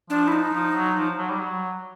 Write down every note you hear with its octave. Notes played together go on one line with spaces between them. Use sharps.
F3 D4
E4
D#4
F3
F#3
F3
F#3
G3
F#3